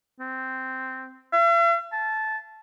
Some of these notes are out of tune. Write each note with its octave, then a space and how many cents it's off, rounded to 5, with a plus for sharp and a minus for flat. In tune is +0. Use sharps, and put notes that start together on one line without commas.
C4 -5
E5 +45
A5 -15